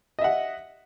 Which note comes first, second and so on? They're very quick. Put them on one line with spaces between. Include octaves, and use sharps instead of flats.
D#5 E5 F#5